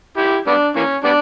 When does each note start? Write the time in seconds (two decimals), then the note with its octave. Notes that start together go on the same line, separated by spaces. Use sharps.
0.17 E4 G4
0.47 G3 B3 D4
0.76 E3 A#3 C#4
1.04 G3 B3 D4